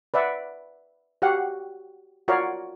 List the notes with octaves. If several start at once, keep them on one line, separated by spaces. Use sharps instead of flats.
B4 D5 E5 F#5
F#4 G4 F5 F#5
F4 F#4 A#4 C#5 D5 F5